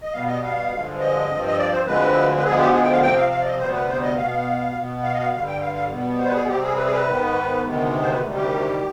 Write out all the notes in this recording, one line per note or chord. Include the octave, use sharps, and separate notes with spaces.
D#5
B2 G3 B3 F5
D#5
F5
G2 D3 F3 G#3
D#5
G2 F3 C4
D#5
D5
C5
D2 D3 F3 G#3 C4 B4
B4
D2 D3 F3 G#3 B3 G#4
G4
G#4
G5
F5
C3 F3 C4 G5
F5
F5
D5
D#5
D2 C3 G3 B3 C5
B4
C5
D#5
B2 B3 F5
B2 B3
F5
D#5
F5
G2 D3 G3 F5
G5
F5
F5
B2 G3 B3
C5
B4
G#4
C3 G3 C4 G4
G#4
B4
G#4
B4
G#2 D#3 B3
D2 C3 D#3 G#3 B3
C5
B4
D2 C3 D#3 G3
G4